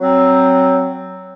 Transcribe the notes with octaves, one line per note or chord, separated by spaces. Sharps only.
F#3 C4